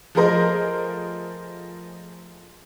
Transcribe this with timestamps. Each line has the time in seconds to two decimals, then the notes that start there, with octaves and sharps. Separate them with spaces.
0.15 F3 A3 G#4 A#4 C5 D#5